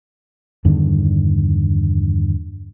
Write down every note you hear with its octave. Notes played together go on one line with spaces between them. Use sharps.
E2 G2 D3 D#3